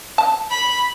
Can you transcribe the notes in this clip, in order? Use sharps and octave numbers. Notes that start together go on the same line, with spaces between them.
A5
B5